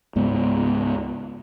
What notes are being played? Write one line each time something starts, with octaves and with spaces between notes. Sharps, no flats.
C#2 G#2 G#3 B3